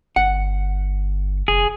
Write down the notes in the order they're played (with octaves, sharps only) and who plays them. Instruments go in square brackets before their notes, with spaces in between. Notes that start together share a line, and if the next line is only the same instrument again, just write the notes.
[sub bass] G1 [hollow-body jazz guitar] F#5
[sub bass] F1 [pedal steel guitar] G#4